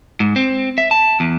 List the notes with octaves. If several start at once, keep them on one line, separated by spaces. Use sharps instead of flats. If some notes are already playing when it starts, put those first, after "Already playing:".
G#2
C4
E5
A5
E2